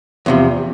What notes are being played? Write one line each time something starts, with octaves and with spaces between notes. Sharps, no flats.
E2 C3 F3